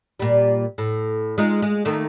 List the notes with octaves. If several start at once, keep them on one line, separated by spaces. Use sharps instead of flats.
A#2 G3
A2
G#3 D#4 F4
G#3
D#3 A3 A#3